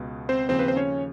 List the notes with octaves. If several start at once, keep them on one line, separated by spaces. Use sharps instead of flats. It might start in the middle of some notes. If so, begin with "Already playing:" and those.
Already playing: C#2 B2
C4 C5
D#2 C#3 F3 C4 C5
B4
C5
C#4 C#5